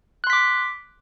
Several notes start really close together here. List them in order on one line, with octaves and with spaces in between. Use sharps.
F#6 C6 B6 D6